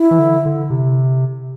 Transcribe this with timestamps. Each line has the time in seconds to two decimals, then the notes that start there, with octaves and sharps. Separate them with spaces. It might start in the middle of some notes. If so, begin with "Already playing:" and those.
Already playing: E4
0.11 E3
0.19 D3
0.45 D3
0.70 C3